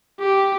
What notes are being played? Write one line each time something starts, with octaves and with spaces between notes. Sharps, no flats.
G4